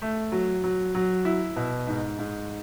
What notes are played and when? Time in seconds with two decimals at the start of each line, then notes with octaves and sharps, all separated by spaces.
0.02 A3
0.32 F#3
0.64 F#3
0.95 F#3
1.25 E4
1.56 B2
1.87 G#2
2.19 G#2